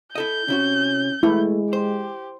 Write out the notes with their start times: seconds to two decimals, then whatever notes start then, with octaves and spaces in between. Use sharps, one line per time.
0.15 E4 A4 D#5 G6
0.48 C3 C#4 E4 F#4
1.23 G#3 A3 E4
1.73 G4 C5